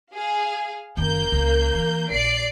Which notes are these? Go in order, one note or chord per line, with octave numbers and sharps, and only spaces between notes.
G#4 F5
F#1 D#3 A#3 G6
C#2
E3
A#1 D5 C7 D7